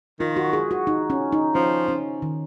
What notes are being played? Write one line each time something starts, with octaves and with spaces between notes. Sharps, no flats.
D#3 F4
F#4
G#4
F#4
D#4
C#4
D#4
F3 C#4
C#4
D#3